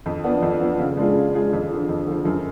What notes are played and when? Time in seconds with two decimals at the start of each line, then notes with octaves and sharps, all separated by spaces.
0.06 F2
0.24 F3 B3 D4
0.42 F2
0.61 F3 B3 D4
0.79 C#3
0.97 G#3 D4 F4 G#4
1.15 C#3
1.34 G#3 D4 F4 G#4
1.53 F2
1.70 D3 F3
1.89 F2
2.07 D3 F3
2.25 F#2